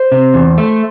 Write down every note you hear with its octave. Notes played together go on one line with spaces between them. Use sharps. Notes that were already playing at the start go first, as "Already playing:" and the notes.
Already playing: C5
C3
E2
A3